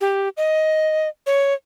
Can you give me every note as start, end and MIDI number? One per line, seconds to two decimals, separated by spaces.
0.01 0.29 67
0.37 1.08 75
1.26 1.54 73